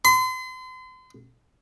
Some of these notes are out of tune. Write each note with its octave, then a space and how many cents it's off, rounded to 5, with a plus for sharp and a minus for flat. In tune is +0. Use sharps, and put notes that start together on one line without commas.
C6 -40